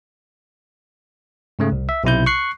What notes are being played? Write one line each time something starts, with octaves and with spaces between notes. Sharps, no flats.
G#2 C#3 A3
C2
E5
B1 C3 E4 G6
C#6 F#6 C7